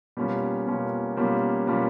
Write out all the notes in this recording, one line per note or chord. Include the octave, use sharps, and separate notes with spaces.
B2 G3 A#3 C#4 F4
B2 G3 A#3 C#4 F4
B2 G3 A#3 C#4 F4
B2 G3 A#3 C#4 F4